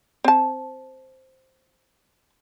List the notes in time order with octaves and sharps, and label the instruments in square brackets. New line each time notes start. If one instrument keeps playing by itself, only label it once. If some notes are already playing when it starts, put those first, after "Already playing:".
[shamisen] C4 A5